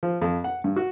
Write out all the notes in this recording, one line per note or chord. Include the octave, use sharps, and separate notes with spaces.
F3
F2
F#5
G2
F#4